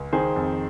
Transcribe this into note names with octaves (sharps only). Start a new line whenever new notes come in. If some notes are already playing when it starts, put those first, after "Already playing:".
Already playing: C#2
D#3 G#4 C5
F2